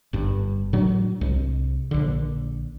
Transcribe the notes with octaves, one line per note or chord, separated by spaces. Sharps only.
G1 G2
A2 F#3 D4
C2
A#1 D3